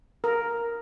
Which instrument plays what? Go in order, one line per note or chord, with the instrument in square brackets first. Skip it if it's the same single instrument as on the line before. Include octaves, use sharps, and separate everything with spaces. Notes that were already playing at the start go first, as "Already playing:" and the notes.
[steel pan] A#4